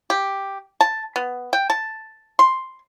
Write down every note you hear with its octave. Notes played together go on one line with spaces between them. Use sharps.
G4
A5
B3
G5
A5
C6